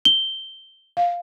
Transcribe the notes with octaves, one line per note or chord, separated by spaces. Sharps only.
G7
F5